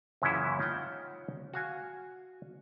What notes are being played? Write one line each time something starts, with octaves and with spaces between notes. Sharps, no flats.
F#2 A#2 C#3 E3 C#4 E4
C#4 D#4 F4 F#5 G5
F#4 F5 G#5